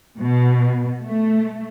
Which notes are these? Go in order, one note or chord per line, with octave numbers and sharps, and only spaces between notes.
B2
A3